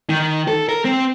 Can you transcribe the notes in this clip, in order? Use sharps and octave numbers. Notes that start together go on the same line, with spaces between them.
D#3
A4
A#4
C4